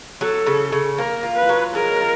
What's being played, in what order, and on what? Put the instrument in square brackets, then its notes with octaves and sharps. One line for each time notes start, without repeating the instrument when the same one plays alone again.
[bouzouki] F#3 [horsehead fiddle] A4
[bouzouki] C#3
C#3
[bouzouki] A#3 [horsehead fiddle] A#4
[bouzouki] F4
[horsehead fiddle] B4
[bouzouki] F#3
[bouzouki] G#3 [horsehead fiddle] A#4
[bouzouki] F4